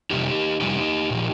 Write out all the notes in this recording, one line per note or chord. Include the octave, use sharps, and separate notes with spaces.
F2 C3 G3 D#4 G4
F2 C3 G3 D#4 G4
A#2 F3